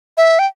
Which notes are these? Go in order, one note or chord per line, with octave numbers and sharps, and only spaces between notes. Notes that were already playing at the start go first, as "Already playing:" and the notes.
E5
G5